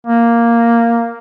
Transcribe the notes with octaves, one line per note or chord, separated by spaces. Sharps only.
A#3